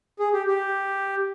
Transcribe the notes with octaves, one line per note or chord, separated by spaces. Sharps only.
G#4
G4
G4